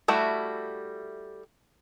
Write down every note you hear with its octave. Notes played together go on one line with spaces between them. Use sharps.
G3 A3 E4 F#4